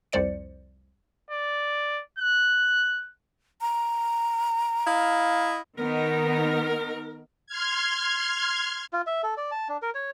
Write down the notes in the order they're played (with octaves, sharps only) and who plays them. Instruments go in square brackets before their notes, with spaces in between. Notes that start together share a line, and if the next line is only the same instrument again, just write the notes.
[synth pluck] C2 F2 C5 D5 C#7
[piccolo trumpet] D5
F#6
[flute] A#5
[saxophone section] E4 D#5 F5
[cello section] D#3 B3 D#4 [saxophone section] A#4
[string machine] C6 F6 G#6
[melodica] F4
E5
A4
D5
A5
D4
A#4
C#5